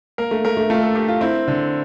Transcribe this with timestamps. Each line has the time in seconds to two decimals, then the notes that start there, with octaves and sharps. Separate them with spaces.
0.18 A#3 A#4
0.31 A3
0.45 A3 A#4
0.57 A3
0.70 A3 F4
0.82 A4
0.95 G4 A#4
1.08 F4
1.21 C4 E4
1.48 D3